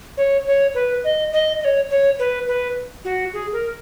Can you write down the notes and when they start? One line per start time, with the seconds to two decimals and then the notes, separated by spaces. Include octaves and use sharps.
0.17 C#5
0.47 C#5
0.75 B4
1.04 D#5
1.33 D#5
1.61 D#5
1.65 C#5
1.90 C#5
2.19 B4
2.48 B4
3.05 F#4
3.33 G#4
3.53 A#4